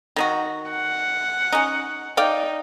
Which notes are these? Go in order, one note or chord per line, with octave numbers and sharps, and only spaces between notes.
D#3 D#4 F#4
F#5
C#4 D#4
D#4 D5 F5 G5